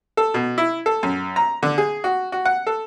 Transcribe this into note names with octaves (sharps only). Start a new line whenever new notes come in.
A4
B2
E4
A4
F#2
A#5
D3
G#4
F#4
F#4
F#5
A4